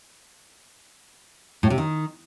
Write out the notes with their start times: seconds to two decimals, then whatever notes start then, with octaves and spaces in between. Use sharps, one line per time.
1.63 A2
1.70 C3
1.78 D#3